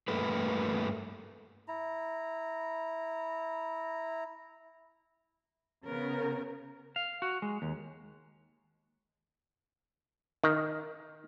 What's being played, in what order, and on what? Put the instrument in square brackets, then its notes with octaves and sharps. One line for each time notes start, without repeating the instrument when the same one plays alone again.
[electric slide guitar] G2 A3 A#3 B4
[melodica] E4 A#5
[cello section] C#3 B3 A#4
[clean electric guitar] F5
F#4
G#3
D#2
[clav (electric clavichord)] D#3